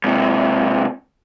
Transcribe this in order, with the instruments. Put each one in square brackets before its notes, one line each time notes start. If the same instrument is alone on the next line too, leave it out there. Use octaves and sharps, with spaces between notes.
[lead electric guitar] G#2 C3